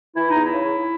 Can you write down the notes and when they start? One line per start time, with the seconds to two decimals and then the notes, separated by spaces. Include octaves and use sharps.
0.16 E3 E4
0.30 E2 D#4
0.44 E4
0.54 C#3